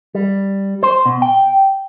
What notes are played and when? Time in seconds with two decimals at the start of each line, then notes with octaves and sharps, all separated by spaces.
0.15 G3
0.83 C5
1.06 B2
1.22 G5